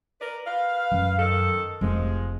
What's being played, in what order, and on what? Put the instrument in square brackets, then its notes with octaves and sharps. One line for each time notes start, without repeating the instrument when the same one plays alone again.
[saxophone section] A#4 B4 D5
B4 F5
[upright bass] F#2
[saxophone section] D#3 A4
[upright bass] F1 A3 [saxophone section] F3 G#3